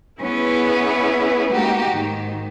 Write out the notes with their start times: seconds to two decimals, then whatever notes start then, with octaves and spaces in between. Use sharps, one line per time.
0.21 B3 C#4 E4 G#4 B4
1.50 G#3 A#3 D#4 F#4 G4
1.91 G#2 D#3